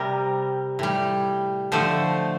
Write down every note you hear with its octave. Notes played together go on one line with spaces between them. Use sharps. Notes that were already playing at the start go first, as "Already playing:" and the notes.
Already playing: C3 G3 A#4
A2 G3
D3 F3 A3 C5